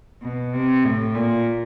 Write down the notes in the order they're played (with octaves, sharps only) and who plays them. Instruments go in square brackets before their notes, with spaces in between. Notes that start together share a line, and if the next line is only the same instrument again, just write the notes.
[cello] B2
C3
A2
A#2